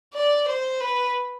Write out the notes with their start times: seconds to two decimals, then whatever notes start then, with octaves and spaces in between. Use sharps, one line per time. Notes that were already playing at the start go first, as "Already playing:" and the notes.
0.14 D5
0.48 C5
0.80 B4